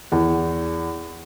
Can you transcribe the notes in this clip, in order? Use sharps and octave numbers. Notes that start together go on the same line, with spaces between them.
E2